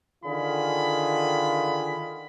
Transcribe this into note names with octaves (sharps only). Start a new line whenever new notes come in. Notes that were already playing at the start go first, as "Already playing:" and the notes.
D3 D#3 F4 G#4 B5